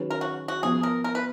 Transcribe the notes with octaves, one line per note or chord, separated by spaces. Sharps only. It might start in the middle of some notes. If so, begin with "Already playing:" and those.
Already playing: D#3 F#3 C#4 G#4 B4
A#4
F#4
F#4
F3 B3 F4 G#4
A#4
A#4
B4